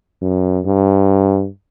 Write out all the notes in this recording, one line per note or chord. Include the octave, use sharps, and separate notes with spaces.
F#2
G2